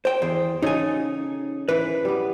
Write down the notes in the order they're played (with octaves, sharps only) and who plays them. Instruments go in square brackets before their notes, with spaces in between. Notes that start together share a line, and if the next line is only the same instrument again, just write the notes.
[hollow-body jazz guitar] C5 G5
[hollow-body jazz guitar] E2 [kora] C5
[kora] C#3 G#4 A4 [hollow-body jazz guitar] D#4 G#5
[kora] E3 [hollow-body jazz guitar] B4
[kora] G3 B3